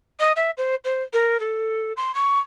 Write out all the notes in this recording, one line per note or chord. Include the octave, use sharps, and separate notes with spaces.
D#5
E5
C5
C5
A#4
A4
C6
C#6